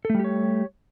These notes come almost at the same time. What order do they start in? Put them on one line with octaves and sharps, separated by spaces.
A4 A3 G3 G4 C#5